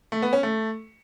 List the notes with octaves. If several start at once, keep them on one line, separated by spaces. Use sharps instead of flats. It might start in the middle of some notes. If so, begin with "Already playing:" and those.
A3
B3
C#4
A3